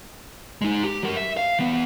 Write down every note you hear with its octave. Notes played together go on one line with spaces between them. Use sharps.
G#3 D#4
G4
F#3 A#4
E5
F5
E3 B3